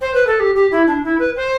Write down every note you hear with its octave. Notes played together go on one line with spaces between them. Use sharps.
C5
B4
A4
G4
G4
E4
D4
E4
B4
C5